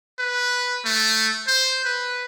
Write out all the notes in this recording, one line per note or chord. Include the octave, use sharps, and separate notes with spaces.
B4
A3
C5
B4